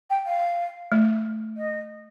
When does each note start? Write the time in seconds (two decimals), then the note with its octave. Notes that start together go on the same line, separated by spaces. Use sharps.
0.10 G5
0.26 F5
0.92 A3
1.57 D#5